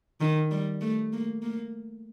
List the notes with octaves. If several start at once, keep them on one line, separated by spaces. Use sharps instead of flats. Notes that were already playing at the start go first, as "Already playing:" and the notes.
D#3
G3
A3
A#3
A#3